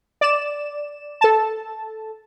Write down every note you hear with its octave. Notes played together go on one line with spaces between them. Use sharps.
D5 E7
A4 A5